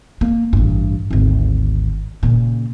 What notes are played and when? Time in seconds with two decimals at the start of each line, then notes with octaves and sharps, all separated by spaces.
0.21 A#3
0.53 A1 G2
1.11 G#1 D2
2.23 A#2 C#3